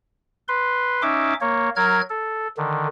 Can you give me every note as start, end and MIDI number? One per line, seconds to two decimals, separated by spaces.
0.48 1.02 71
0.48 1.02 84
1.02 1.34 61
1.02 1.34 63
1.02 1.34 76
1.02 1.34 86
1.41 1.69 58
1.41 1.69 73
1.76 2.01 54
1.76 2.01 70
1.76 2.01 89
1.76 2.01 92
2.10 2.48 69
2.57 2.88 50
2.57 2.88 51